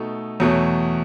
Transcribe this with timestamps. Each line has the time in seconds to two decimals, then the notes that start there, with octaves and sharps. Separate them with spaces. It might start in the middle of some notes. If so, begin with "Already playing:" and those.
Already playing: B2 A3 D#4 A4
0.40 E2 B2 F#3 A3